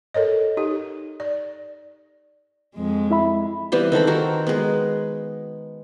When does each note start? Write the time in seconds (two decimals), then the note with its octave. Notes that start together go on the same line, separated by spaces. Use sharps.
0.14 A4 A#4 C#5 D#5
0.57 D#4 G4
1.20 D5
2.76 F2 G#3
3.11 E4 E5 B5
3.72 E3 G3 B3 C4
3.92 D#3 C4 A4 B5
4.07 C4 F#4 A#4
4.47 G#3 B3